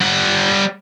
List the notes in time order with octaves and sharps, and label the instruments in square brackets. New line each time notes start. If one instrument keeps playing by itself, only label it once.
[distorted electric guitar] G3 F#5